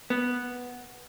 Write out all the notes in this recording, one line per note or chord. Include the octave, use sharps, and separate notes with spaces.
B3